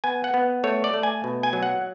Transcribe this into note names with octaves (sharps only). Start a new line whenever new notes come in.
B3 G#5
F#5
B3
A3 C#5
D5
A3
G#5
B2
G#5
F#3
F#5